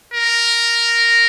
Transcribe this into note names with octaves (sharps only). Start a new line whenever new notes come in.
A#4